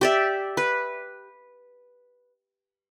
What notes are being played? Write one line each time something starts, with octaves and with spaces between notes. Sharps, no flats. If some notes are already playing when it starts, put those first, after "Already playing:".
G4 D5 E5
B4